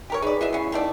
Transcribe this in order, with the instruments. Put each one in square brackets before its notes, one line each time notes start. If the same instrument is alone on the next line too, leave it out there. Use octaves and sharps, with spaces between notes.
[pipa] G4 A#4 C#5
[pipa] D#4 D5 [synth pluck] G#4 B4 B6
[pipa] F#3 D#5 E5 [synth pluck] E4 C7
[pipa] B3 C#4
D#3 A3 D5